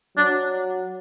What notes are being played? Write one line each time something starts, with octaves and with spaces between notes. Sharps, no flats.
F#3 D4